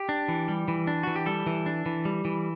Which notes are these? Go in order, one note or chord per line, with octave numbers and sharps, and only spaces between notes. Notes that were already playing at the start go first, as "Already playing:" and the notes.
Already playing: G4
D4
E3
G3
E3
D4
E3 F#4
G4
G3 A4
E3
D4
E3
G3
E3